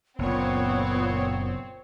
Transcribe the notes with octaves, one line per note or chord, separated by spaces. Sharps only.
F#1 A#2 B3 C4 C#5